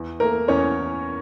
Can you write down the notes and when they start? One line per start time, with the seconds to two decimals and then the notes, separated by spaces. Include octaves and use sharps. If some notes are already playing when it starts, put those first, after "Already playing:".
Already playing: E2
0.20 A3 A#3 A#4
0.48 E2 C#4 C#5